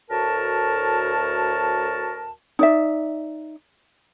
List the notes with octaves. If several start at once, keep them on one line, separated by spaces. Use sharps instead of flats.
D2 A2 F#4 A#4 A5
D#4 D5 E5